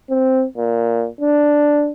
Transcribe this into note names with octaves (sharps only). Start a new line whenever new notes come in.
C4
A#2
D4